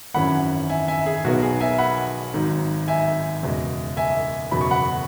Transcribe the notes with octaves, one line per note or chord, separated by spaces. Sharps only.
G#1 F#2 E3 C#4 F#5 B5
E5 G#5
E5 G#5
G#4
B1 B2 F#3 B3 F#4
G#4
E5 G#5
F#5 B5
G#1 G#2 F#3
E5 G#5
F#1 E2 B2 G#3
E5 G#5
F#1 E2 B2 F#3 B5
C#6
F#5 B5